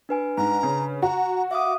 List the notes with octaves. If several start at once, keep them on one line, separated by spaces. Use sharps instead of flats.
D4 B4 G#5
G#2 A#5
C#3
F#4 A#5
E5 F5 D6 D#6